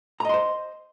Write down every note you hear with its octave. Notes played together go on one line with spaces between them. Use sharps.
C5 D#5 A#5 C6